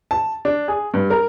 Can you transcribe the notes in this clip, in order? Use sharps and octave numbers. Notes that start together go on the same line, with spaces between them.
A5
D4
G#4
G2
A#4